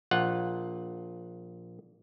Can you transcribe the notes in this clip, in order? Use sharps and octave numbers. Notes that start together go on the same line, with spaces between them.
A#1 F4 F#5